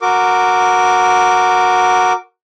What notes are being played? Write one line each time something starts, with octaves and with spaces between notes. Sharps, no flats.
F#4 A#4 D6